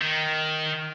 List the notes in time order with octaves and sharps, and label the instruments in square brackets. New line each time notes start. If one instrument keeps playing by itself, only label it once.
[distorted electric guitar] D#3